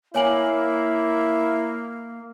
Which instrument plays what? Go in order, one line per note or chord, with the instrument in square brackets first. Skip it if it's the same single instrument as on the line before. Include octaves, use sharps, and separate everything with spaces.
[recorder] A#3 [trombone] E4 [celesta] C#5 G#5 F#7